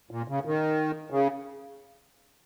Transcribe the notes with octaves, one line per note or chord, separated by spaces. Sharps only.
A#2
C#3
D#3
C#3